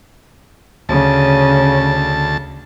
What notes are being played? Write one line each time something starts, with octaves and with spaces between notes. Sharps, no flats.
D2 C#3 A5